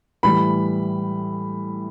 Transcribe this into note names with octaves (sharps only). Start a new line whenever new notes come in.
A2 E3 G3 B5